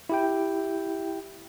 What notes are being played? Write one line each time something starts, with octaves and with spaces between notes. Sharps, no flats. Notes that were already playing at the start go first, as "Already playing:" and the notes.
E4 G4 G5